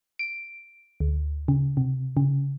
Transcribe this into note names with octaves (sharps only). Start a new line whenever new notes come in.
D7
D2
C#3
C3
C#3